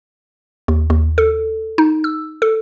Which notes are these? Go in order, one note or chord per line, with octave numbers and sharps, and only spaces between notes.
D#2
D#2
A4
D#4
E6
A4